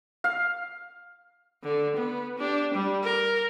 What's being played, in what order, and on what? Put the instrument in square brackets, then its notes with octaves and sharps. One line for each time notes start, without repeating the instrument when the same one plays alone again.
[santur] F5
[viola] D3
B3
D4 G4
G3
A#4